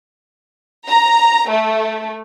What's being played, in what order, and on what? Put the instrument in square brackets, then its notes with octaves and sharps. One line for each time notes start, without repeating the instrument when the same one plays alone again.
[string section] A#5
A3